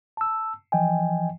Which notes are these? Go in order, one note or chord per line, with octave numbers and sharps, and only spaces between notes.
A5 E6
E3 F3 D#5 G5 G#5